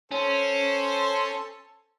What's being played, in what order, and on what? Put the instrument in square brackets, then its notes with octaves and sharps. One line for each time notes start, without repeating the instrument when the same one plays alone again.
[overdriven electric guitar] C#4 [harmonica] A4 C5